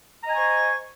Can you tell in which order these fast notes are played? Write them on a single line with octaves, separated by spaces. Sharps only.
A#5 D#5 G#5 C#6 C5